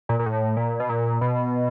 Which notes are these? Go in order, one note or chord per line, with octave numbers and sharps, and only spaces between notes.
A#2
A#2
A2
A#2
B2
A#2
B2